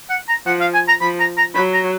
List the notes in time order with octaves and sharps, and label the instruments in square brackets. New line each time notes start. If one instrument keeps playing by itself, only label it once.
[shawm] F#5
A#5
[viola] F3 [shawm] F#5
[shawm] F5
G#5
A#5
[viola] F3 [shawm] B5
[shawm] A#5
A#5
[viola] F#3 [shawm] B5
[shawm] A#5